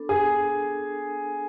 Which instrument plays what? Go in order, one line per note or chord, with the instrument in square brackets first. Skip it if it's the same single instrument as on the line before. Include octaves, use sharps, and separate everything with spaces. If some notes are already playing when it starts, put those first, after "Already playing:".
Already playing: [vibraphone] B3 D4 A4
[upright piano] G#4